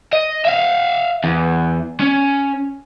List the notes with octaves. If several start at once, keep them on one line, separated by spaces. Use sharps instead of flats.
D#5
E5 F5
E2
C#4